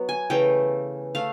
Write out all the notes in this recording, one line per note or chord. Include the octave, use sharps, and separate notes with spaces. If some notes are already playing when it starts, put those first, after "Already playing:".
Already playing: F#3 B3
G#5
C#3 E3 A3 G5
A3 F5